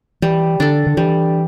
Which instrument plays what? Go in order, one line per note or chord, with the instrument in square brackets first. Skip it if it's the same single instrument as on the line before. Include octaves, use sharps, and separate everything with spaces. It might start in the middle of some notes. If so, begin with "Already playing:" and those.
[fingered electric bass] E3 [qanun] G3
[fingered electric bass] D3 [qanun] D4 A4
[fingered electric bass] D3
[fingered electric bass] E3 [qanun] G3